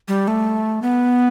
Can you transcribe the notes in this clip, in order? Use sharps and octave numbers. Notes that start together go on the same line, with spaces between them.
G3
A3
B3